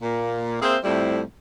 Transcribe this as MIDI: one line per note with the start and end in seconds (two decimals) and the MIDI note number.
0.02 0.58 46
0.02 0.58 58
0.62 0.77 58
0.62 0.77 60
0.62 0.77 68
0.62 0.77 72
0.62 0.77 76
0.84 1.22 41
0.84 1.22 45
0.84 1.22 55
0.84 1.22 57
0.84 1.22 60
0.84 1.22 64